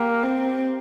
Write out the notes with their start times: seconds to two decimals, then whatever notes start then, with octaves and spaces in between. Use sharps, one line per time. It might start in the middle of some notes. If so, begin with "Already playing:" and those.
Already playing: A#3 G4
0.23 C4